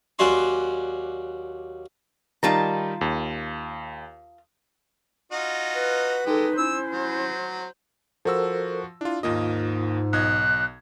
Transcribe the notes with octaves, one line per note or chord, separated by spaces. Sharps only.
D#2 F#3 C#4 D5 C6
D#3 G3 D#4 F4 A5 A#5
D#2
D#4 F4 F#4
B4
G#3 D#4 G4 A4
C#4 E4 C5 E6
F#3
F3 F#4 A4 A#4 C5 E6
D4 E4 F4
D#2 G#2 A#3 F4 D#5
B1 D#5 F#6 G#6